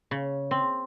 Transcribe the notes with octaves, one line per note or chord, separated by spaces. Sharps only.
C#3
C4